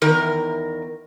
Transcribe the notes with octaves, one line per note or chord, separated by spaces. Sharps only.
E2 D#3 A#4